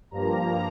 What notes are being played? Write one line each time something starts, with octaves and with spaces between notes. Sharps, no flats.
G2 F3 A#3 A#5